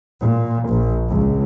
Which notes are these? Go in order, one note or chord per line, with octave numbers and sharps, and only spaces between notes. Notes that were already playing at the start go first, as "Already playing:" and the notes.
A#2
A#1
C#2